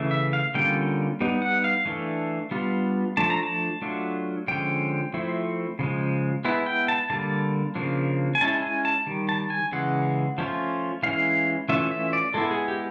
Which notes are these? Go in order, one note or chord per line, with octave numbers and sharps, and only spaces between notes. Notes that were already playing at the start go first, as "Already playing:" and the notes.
Already playing: C#3 E3 A3
E5
F5
D3 G3 A#3 C#4 F4 G5
G3 B3 D#4
F#5
F5
E3 A3 D4
G3 B3 D4 F4
F3 A3 D4 A5
A#5
A5
F#3 A3 D4 F4
D3 F3 G#3 C#4 G5
F3 A3 C4 E4
C#3 F3 G#3
G#3 B3 E4
G5
A5
D3 G3 A#3 A5
C#3 F3 A#3 D4
G#5
G#3 C#4 E4 A5
G#5
A5
D#3 G3
A5
G#5
C#3 E3 G#3 F#5
F3 A3 C#4 F4
E3 G#3 C#4 E4 F5
E3 A3 C#4 F4 E5
E5
D5
G#3 B3 E4 A4
G#4
G4